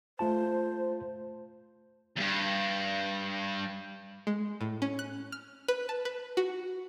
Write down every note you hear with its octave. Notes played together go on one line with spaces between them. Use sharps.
A3 F4 C5 A5
E2 G2
G#3
A2
C#4
F#6
F6
B4
A5
B4
F#4